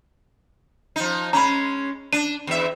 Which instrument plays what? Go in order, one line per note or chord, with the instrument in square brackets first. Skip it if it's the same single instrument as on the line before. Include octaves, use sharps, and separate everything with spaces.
[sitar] F3 D#4
[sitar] G#3 C#4 [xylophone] A#5 B5
[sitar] D4 [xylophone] D#7
[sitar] E2 E5